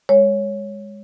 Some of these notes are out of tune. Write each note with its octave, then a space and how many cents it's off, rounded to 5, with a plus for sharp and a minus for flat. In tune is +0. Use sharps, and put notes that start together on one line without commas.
G#3 -20 C#5 +0